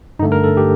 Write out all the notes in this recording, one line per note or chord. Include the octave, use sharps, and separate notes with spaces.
G2 D3 A3 D#4
A#4
A4
G4